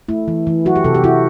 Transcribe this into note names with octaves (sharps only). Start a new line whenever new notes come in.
A3 E4
E3
E3
F#3 F#4
G4
C3 A4
G4
E4 F#4